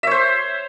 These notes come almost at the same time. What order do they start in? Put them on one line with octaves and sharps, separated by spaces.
E5 C#5 C5